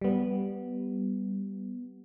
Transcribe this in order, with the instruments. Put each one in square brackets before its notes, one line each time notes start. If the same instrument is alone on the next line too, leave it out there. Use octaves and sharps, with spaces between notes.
[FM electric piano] G3 B3